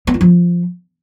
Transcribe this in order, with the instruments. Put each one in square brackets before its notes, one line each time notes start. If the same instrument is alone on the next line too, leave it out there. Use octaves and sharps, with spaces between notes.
[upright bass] B3
F4
F3